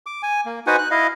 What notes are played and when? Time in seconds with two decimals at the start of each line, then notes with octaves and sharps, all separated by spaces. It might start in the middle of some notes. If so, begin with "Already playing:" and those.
0.06 D6
0.23 G#5
0.46 A#3
0.67 D#4 F#4 B4 C5 F#5 G#5
0.79 F#6
0.91 E4 D#5 F5